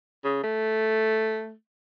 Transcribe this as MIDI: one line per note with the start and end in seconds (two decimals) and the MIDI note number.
0.24 0.41 49
0.43 1.53 57